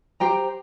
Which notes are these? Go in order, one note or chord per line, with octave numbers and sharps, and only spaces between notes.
G4 C5 G5 A#5